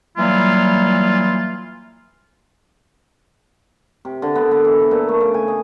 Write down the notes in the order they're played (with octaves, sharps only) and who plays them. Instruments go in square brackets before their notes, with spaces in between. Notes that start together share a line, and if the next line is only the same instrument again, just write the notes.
[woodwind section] E3 F#3 G3 A#3 F4
[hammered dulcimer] C3
D3
B3
B3
E3
A4
A#2
A3
C#3
G#5
D#5